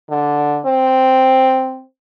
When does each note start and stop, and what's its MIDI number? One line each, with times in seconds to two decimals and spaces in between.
0.10 0.60 50
0.66 1.82 60